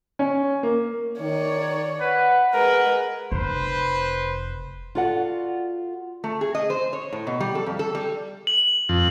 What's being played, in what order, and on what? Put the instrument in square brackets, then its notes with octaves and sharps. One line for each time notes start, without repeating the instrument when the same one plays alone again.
[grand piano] C#4
A#3
[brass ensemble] D#3 [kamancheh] C#5 D5
[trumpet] B4 [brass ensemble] F#5
[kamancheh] G#3 B4 [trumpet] A#4
[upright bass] F1 [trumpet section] B4 C5
[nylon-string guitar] F4 F#4 A4 D5 F#5
[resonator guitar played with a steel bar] A3
G#4
D#5
C5
C#5
A2
B2
G3
A4
F2
A4
G3
[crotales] F#7
[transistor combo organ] F2